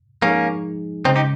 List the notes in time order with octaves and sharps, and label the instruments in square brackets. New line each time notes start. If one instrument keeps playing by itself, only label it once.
[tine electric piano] F3 G#3 D#4 G#4 [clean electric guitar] A#3 C#4
[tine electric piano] C#3 G#3 C#4 [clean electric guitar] C4 D#4
[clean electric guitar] D#4 G4